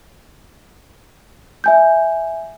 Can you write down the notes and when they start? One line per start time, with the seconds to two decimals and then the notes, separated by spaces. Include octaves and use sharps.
1.64 E5 G#5 G6